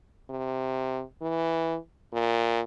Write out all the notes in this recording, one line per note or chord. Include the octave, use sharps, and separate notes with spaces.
C3
E3
A#2